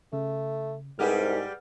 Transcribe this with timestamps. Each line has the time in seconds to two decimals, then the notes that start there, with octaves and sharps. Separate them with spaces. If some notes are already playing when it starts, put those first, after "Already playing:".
0.13 C#3 A3
0.99 C2 G#2 G3 G4 G#4 B4 F#5 F6